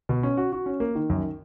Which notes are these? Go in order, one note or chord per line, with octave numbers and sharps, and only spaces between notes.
B2
C#4
F#4
F#4
C#4
A#3
D#3
F#2